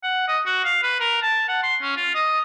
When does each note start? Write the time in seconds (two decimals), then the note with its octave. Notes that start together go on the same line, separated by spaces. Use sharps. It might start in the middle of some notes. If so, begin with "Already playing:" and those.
0.03 F#5
0.28 D#5
0.46 F#4
0.64 F5
0.83 B4
1.00 A#4
1.22 A5
1.48 F#5
1.63 C6
1.82 C#4
1.96 F4
2.15 D#5